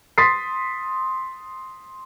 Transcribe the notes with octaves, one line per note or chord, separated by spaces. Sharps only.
C6 D#6 A6 B6 C7